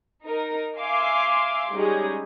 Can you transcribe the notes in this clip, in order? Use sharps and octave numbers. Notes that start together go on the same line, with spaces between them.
D#4 A#4
E5 F5 G#5 C6 D6
G3 G#3 C#4 D#4 G4 G#4